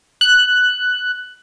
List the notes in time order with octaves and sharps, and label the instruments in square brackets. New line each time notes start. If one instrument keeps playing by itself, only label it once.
[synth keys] F#6